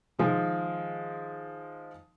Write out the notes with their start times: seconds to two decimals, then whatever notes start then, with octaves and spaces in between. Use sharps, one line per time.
0.19 D#3 F3 G#3